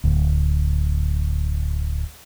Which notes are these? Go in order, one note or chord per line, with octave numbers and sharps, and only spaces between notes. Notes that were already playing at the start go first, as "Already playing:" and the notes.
D1 D2